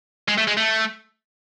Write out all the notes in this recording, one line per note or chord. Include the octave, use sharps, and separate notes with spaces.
G#3
A3
G#3
A3